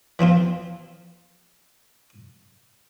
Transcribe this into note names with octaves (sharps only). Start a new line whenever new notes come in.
E3 F3 C4 F4